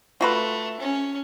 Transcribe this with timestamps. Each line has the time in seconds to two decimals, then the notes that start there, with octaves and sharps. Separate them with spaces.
0.21 A3 F4 F#4 B4
0.80 C#4